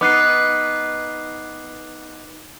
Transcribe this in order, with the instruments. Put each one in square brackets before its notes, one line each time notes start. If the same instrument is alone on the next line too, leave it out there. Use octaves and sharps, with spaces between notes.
[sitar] B3 D#4 [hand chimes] D6 F#6 C7